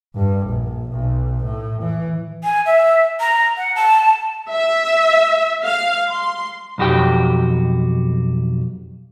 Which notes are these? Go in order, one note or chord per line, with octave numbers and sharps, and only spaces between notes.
G2
A#1
B1
A2
E3
G#5
E5
A#5
F#5
A5
E5
F5
C6
B1 F2 F#4 G4 G5